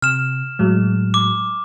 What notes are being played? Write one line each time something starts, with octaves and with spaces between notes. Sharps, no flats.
C3 F6 E7
A2 F#3 G#3
D6